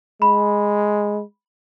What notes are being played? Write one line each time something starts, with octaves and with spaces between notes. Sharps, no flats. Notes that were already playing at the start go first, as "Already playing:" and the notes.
G#3 B5